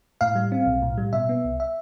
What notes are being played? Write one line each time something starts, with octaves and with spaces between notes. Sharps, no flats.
A2 F5
G3
C4
B1
A2
G3
B2 E5
B3
C2
E5